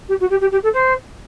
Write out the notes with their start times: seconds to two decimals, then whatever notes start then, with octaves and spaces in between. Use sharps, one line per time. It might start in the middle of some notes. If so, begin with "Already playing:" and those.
0.08 G4
0.20 F#4
0.30 G4
0.40 G4
0.51 G4
0.63 A4
0.73 C5